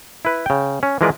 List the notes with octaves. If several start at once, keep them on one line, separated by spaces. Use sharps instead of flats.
E4 B4
C#3 G5
C#4
E3 F3 G#3 A#4 B4 D5